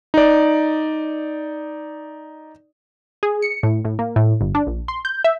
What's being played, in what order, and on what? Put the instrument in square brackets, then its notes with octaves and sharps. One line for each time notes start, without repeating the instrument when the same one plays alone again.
[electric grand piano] D#4 D5
[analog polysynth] G#4
C#7
A2
A2
A#3
A2
G1
D4
A#1
C6
G6
E5